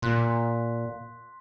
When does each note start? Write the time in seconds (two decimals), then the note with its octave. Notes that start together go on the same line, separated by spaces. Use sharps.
0.02 A#2 C6 F#6 B6